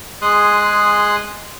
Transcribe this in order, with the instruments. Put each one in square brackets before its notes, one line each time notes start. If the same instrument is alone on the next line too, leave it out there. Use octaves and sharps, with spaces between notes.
[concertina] G#3 G#4 C6 D#6 F#6